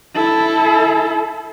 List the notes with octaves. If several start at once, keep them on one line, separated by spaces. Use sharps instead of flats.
E4 A4